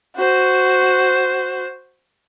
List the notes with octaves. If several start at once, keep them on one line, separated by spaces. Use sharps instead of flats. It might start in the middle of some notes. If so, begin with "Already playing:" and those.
F#4 C5